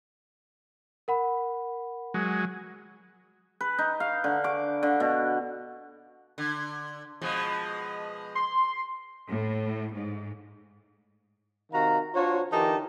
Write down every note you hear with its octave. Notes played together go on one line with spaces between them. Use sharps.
A#4 F#5 B5
F#3 G#3
B4
D#4
F5
D3
D6
D3
B2
D3
B2 F3 G#3
C6
A2
G#2
C3 D#3 F#4 F5 A#5
D4 F4 F#4 C5 C#5
D3 E3 D#4 G4 A#4 A5